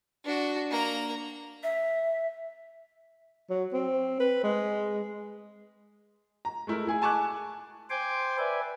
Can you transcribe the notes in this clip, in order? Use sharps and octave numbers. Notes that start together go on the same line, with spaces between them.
D4 F#4
A#3 A#5
E5
F#3
C4
B4
G#3
A#5
G#3 A3 E4 A#4
E4 G#4 G#5
G#5 A5 C#6 D6 F#6
C5 G5 G#5 C6 D6
B4 D5 E5 G#5